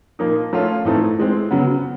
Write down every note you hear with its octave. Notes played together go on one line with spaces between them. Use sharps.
A#2 F3 A#3 D#4
F3 A3 C#4 F4
A2 E3 A3 C4 D#4
E3 G#3 C4
C#3 F#3 B3